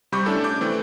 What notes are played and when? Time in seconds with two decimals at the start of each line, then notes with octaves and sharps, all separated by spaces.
0.12 C3 G3 B5 C#6 D6 G6
0.26 A3 C#4 D4 E4 A4
0.44 D6 G6
0.61 E3 A3 C4